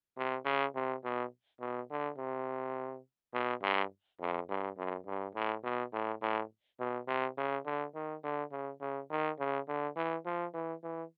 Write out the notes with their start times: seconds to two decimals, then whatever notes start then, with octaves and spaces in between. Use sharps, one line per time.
0.17 C3
0.45 C#3
0.75 C3
1.04 B2
1.60 B2
1.90 D3
2.18 C3
3.34 B2
3.63 G2
4.21 F2
4.49 G2
4.78 F#2
5.06 G2
5.35 A2
5.64 B2
5.93 A2
6.22 A2
6.80 B2
7.08 C3
7.38 C#3
7.66 D3
7.95 D#3
8.24 D3
8.52 C#3
8.81 C#3
9.10 D#3
9.39 C#3
9.68 D3
9.96 E3
10.26 F3
10.54 E3
10.83 E3